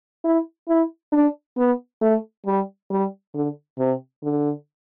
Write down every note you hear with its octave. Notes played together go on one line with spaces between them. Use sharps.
E4
E4
D4
B3
A3
G3
G3
D3
C3
D3